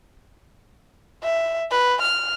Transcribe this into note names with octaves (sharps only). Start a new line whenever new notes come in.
E5
B4
F6